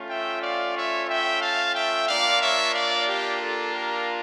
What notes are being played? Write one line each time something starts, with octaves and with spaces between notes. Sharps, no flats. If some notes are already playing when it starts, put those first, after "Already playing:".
Already playing: A3 C#4 F4
E5 G5
D5 F5
C#5 E5
E5 G5
F5 A5
E5 G5
A#3 D4 F4 D5 F5
C#5 E5
D5 F5
G4
A4
G4 A#4